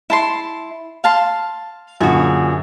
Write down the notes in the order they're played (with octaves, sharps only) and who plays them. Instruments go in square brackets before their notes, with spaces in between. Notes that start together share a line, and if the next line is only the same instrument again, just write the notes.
[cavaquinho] E4 A5 C6
F5 A5 C6
[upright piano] F#2 A#2 D3 [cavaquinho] F#4 G#4